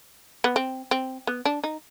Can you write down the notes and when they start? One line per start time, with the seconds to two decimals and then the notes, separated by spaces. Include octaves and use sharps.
0.44 B3
0.56 C4
0.91 C4
1.27 B3
1.45 D4
1.64 D#4